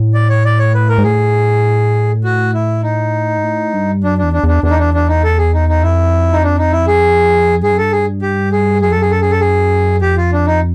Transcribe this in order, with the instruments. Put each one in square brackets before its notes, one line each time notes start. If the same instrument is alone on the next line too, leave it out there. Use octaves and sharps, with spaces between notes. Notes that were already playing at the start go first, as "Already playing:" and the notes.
Already playing: [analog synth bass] A2
[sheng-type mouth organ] D5
C#5
D5
C#5
B4
A#4
[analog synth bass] G#2
[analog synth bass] A2 [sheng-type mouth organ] G#4
[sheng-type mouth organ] F#4
E4
D#4
[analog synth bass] G#2
A2
G2
[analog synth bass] F#2 [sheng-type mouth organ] D4
[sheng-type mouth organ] D4
[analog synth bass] E2
[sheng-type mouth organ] D4
[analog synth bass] E2 [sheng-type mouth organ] D4
[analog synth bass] E2 [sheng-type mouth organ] D4
[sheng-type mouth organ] D#4
D4
D4
D#4
A4
G#4
D#4
D#4
[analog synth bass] F2 [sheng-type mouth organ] E4
[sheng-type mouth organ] D#4
D4
D#4
E4
G#4
[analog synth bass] G2 [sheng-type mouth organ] G#4
[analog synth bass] F#2
[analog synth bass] G2 [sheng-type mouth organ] A4
[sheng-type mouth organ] G#4
G4
G#4
[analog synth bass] F#2 [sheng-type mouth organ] G#4
[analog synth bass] F2 [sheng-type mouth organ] A4
[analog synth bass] F#2 [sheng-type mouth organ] G#4
[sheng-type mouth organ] A4
G#4
A4
G#4
[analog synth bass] F2 [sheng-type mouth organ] G4
[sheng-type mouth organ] F4
D4
D#4